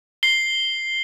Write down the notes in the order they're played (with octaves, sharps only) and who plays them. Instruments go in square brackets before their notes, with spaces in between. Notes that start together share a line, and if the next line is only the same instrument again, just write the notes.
[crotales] C7 G7